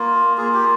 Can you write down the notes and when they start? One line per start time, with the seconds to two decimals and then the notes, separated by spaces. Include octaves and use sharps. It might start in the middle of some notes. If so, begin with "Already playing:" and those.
Already playing: A#3 F4
0.37 A#3 F4 G#4
0.54 G4